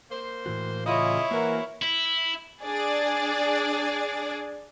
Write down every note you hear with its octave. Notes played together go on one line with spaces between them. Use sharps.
A#3 C5
A2 E3 F#4
C#3 E4 F4 C#5 D#5
E3 A#3 F#4 A#4 C5
E4
D4 G#4 D5